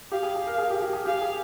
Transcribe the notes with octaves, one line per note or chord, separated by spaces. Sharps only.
G4 F5
G#4
G#4
A#4
G#4
G4
G4
G#4
G4 F5
G#4